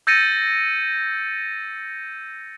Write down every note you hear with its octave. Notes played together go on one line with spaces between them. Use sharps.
E6 G6 A6 A#6 C#7 D#7